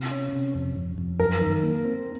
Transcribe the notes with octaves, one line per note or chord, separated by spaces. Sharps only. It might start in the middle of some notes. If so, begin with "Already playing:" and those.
Already playing: C3
C#4
C3
F2
F2
F2
F#2 A#4
D#3
A#3
C4